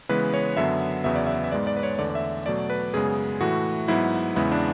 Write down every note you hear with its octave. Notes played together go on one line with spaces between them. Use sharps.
C#3 E3 G#3 B3 B4
C#5
F#2 D3 F#3 B3 E5
E2 C#3 F#3 B3 E5
D5
E5
E5
G#2 G#3 B3 D5
D5
B4
C#5
E2 D3 A3 D5
D5
E5
B2 F#3 A3 D5
B4
F#2 C#3 G#3 B3 G#4
A2 E3 A3 F#4
G#2 F#3 B3 E4
E2 C#3 G#3 B3 E4
D4